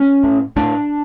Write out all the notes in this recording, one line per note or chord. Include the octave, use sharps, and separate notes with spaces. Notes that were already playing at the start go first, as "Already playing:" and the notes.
Already playing: C#4
A2
A2 D4